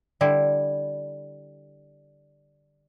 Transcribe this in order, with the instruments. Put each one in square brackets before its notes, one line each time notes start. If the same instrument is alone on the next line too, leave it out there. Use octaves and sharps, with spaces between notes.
[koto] D3 G3 E4